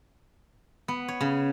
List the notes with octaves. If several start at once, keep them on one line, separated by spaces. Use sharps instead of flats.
B3
C#5
C#3